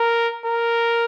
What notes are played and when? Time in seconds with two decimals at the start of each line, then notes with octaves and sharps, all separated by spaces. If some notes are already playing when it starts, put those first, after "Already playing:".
Already playing: A#4
0.46 A#4